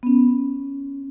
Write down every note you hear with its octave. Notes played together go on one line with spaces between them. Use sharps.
B3
C#4